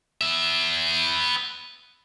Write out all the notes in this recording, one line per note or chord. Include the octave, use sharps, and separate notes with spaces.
B3 E5